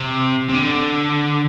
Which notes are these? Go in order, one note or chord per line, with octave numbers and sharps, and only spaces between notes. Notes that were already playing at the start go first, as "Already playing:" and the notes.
Already playing: C3
C3
D3